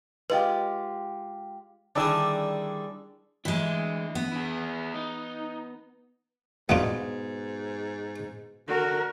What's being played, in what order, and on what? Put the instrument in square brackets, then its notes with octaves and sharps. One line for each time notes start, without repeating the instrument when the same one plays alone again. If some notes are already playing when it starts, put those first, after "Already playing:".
[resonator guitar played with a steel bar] G#3 F4 G4 [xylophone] B4 D#5
[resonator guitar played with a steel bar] D3 D#3 [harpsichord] G3 E4 G#4 [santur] D4 G#5 E6
[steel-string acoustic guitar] E3 G#3 [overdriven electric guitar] D4 E5
[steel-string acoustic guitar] B3
[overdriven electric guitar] E4 G#4
D#4
[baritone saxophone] G#2 [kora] B2 [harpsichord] B3 D4 F4
[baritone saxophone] D3 [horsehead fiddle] F#4 A#4